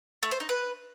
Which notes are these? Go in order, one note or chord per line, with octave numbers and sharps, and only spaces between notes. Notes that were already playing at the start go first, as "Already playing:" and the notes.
A3
C5
D#4
B4